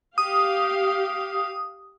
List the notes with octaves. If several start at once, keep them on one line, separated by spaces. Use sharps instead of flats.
G4 F5 D#6